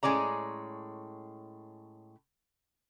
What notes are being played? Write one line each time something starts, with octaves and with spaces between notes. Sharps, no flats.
A2 G#3 C#4 D5 A#5